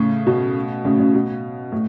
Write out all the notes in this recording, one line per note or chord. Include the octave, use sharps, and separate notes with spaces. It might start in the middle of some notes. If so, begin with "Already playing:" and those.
Already playing: A2 C#3
B2
A2 C#3
A2 C#3
B2
A2